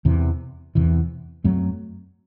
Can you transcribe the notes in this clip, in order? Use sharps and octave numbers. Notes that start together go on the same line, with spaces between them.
E2 C3 E3
E2 C3 E3
F#2 F#3 A3 C4